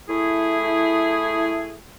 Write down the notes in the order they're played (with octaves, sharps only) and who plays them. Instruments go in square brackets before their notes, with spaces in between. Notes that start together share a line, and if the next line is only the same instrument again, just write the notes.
[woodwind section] A3 E4 G#4